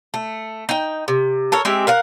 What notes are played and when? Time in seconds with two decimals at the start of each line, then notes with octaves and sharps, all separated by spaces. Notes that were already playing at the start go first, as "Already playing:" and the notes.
0.14 A3
0.69 D#4 G5
1.08 C3
1.52 A4 A#4 C#5
1.65 G#3 C4 G4 E5
1.87 A#4 F5 F#5